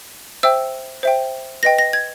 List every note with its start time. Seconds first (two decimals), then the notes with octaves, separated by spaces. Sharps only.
0.43 C5 E5 G5 E6
1.03 C5 E5 G5
1.63 B4 D#5 G5 A#6
1.79 A#6
1.93 G#6